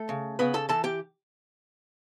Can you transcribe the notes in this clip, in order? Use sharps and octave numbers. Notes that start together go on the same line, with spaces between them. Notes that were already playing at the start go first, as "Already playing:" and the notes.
Already playing: A3 A4
C#3
C#3 B3 B4
A4 A5
E3 A4 A5
G4 G5